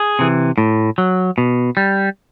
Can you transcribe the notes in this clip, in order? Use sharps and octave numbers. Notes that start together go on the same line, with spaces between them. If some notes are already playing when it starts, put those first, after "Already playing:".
Already playing: G#4
C3 E3
A2
F#3
B2
G3